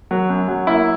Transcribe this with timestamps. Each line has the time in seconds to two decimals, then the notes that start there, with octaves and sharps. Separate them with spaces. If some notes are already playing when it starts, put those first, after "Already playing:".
0.11 F#3
0.29 F#2
0.48 F#3
0.67 A#3 E4